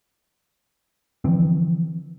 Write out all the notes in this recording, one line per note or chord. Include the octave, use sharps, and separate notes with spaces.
D3 E3 F3 C4